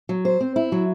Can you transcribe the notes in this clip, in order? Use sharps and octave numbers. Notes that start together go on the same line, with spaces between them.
F#3
C5
C4
E4
F#3